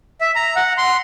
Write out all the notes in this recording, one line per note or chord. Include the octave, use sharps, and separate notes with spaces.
E5
A#5
F#5
C6